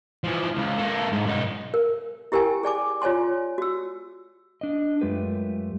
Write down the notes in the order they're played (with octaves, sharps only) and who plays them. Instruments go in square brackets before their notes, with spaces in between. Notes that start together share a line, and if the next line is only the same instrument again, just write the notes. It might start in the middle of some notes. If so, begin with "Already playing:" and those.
[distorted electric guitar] E3 F3
C#2
A#3 A4
G#2
F#2 D#4
[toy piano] A#4
E4 G4 A#4 G5 G#5
G#4 D5 G#5 D6
F4 C#5 D5 G#5 C6
F#4 E6
[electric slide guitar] D4 D#5
F#2 G#3 A3 F4 G4 B4